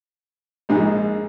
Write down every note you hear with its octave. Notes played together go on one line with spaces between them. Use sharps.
A#1 G#2 G#3